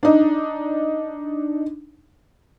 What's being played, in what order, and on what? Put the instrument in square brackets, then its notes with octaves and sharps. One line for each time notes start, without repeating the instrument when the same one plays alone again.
[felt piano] D4 D#4